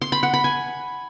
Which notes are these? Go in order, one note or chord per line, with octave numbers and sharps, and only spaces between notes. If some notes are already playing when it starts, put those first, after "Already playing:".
C6
B5
F#5
B5
G#5